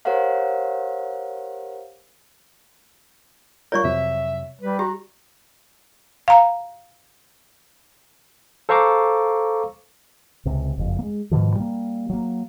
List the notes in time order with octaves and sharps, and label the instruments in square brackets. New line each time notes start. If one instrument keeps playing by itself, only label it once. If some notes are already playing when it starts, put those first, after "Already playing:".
[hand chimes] G4 A#4 C5 C#5 F5 F#5
[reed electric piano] G3 F4 A#4 [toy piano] C#5 D5 C#6
[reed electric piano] F2 C3 F#3 [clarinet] E5
[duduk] G3 [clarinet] B4
[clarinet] F#4 [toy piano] G4 [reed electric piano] A#5
[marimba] F5 A#5
[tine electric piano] A4 C5 F5 A#5 C#6 D6
[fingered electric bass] C#2 C3
F#1 F2
G#3 A#3
G#2 B2 D#3 F3
G3 A#3
F#3 A#3